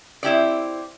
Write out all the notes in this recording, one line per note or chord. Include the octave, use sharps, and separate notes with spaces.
C4 E4 G4 D5